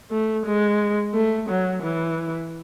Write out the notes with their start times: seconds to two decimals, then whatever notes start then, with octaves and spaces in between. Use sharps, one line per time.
0.11 A3
0.46 G#3
1.14 A3
1.49 F#3
1.83 E3